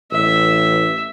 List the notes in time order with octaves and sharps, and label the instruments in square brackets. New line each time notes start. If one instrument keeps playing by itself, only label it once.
[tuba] A1 [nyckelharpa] E5